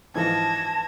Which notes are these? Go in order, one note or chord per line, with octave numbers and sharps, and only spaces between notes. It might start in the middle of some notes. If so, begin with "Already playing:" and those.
G#2 E3 F3 A5 G#6 A#6